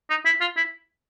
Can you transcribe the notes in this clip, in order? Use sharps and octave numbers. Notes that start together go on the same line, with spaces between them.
D#4
E4
F4
E4